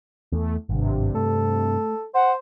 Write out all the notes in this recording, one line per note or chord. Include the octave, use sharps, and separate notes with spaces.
E2 A3
G#1 G2 C3
A3 A4
C5 F#5